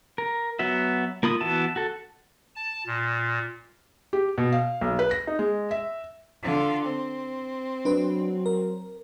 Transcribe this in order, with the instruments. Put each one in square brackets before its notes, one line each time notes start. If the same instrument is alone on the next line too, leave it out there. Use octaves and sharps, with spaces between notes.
[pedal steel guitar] A#4
F#3 B3 F#4 E5
A#3 F4 B5 D#6
E3 B3 F#4 E5 A5
F#4 A4
[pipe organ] A5
A#2
[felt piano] G4
B2
F5
B1
B4
A#6
D#4
G#3
E5
[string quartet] D3 F4
C4
[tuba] F#3 [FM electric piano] D4 B4
[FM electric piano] A#4